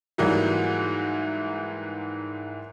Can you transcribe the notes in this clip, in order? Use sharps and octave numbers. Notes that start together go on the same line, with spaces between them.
G#2 E3 F#3 G3 A#3